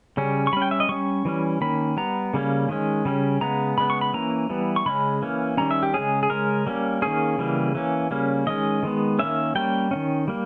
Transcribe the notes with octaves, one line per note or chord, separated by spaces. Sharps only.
C#3 G3 C#4
C#6
G3 C#4 B5
G5
E5
D#5
G3 C#4 C#6
E3 G3 C#4
D#3 A#3 C#4 B5
G3 B3 A#5
C#3 G3 A#3 C#4
D#3 G#3 C#4
C#3 G3 C#4
C#3 G#3 B3 A#5
C#3 G#3 B3 B5
C#6
B5
E3 A#3 C#4 A#5
E3 G3 B3
C#6
C#3 G#3 C#4 B5
E3 A#3 C#4
D#3 G3 C#4 A#5
E5
G4
C#3 G#3 C#4 G#4
G#4
C#3 G#3 C#4 A#4
G3 A#3 C#4
D#3 A#3 C#4 G#4
C#3 E3 G3 A#3
E3 A#3 C#4
C#3 G3 A#3 C#4
D#3 G#3 C#4 D#5
D#3 G#3 B3
D#3 A#3 C#4 E5
G3 A#3 C#4 G5
D#3 A#3 C#4
G3 A#3